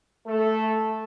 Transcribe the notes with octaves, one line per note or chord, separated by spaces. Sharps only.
A3 A4